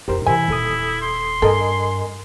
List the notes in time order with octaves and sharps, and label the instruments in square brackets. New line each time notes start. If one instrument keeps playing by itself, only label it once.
[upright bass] F1 D#4 [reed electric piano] G4 A#4 C5
[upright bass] C3 E3 [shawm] E4 [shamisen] G#5
[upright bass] D#1 [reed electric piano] D#2 A4 D#6
[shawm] C6
[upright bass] G2 [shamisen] A4 [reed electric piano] A#4 D#5 G#5